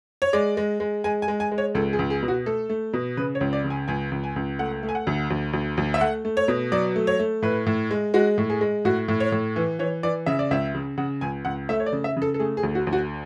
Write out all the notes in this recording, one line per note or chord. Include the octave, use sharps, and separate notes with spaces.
C#5
G#3 D5
G#3
G#3
G#3 G#5
G#5
G#3
G#5
G#3
C#5
C#2 A4
G#4
C#2
G#4
B2
F#4
A3 A4
A3
B2
C#3 B4
C#5
C#2
D5
C#3
G#5
C#2 G#5
C#2
G#5
C#2
A3 F#5
A3
G#5
F#5
D2
D2
D2
D2
E5
A3 F#5
A3
C#5
B2
F#3 D5
A3
C#5
A3
A2 B4
A2
G#3
G#3 F#4
A2
G#4
G#3
A2 F#4
A2
C#5
A2
E3
E3 C#5
E3 D5
C#3 E5
D5
C#2 E5
C#3
C#3 F#5
C#2 G#5
C#2 F#5
A3 E5
C#5
D5
C#3
E5
C#3
A4
A4
A3 G#4
G#4
D2
F#4
D2
F#4